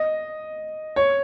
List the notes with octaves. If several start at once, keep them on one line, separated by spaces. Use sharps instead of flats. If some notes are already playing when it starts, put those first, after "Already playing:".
Already playing: D#5
C#5